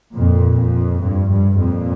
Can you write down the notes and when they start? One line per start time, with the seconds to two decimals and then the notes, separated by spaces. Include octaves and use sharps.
0.15 F2 A#2
0.59 F2
1.02 G2
1.31 G2
1.60 F2 A#2